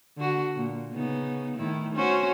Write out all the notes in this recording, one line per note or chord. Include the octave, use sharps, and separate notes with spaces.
D3 F#4
A#2
C#3 B3 D#4
A2 D#3 E4
C#4 F#4 C5